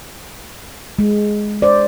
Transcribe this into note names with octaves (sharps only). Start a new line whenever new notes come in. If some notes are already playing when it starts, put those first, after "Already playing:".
G#3
C5 D5